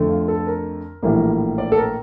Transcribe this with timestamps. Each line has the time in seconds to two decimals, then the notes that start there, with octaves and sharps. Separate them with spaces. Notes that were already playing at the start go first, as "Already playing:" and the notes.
Already playing: F2 D3 A3
0.10 F4
0.28 A4
0.47 A#4
1.02 A#1 A2 E3 G3 A#3
1.58 D5
1.72 A4
1.77 A#4